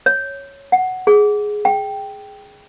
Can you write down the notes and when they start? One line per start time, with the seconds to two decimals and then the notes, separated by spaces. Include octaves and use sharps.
0.06 C#5
0.72 F#5
1.07 G#4
1.65 G5